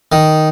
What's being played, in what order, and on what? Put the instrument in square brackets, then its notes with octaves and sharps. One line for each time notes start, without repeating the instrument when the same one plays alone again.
[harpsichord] D#3